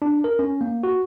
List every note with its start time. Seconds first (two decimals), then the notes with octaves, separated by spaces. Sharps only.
0.02 D4
0.24 A#4
0.39 C#4
0.61 A#3
0.83 F#4